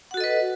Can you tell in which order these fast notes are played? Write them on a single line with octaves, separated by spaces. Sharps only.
F#5 F#4 A4 D#5 B4